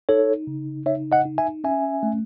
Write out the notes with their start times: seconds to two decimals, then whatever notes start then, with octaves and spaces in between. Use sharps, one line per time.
0.09 D#4 A4 C#5
0.47 C#3
0.86 D#4 C#5 E5
1.12 D#5 F#5
1.25 D#4
1.38 E5 G#5
1.64 C#4 E5 G#5
2.03 A3